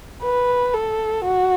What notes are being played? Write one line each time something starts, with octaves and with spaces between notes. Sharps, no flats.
B4
A4
F#4